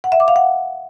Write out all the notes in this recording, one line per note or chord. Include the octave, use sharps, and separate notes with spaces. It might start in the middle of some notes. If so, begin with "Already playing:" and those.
F#5
E5
D6
F5
F#5